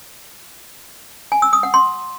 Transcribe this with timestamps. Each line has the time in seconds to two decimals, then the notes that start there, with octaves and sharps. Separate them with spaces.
1.32 G#5
1.42 E6
1.53 D#6
1.63 F#5
1.74 C6